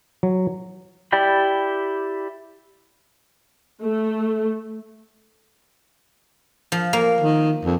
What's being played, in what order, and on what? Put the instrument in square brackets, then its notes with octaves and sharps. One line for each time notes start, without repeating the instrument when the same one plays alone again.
[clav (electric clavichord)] F#3
[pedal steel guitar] E4 G4 D5 G5 B5
[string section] A3
[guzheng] F3
A#3
[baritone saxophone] D#3
F2